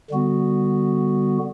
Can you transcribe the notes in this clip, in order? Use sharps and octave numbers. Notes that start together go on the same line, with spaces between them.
D3 G3 B3 F#4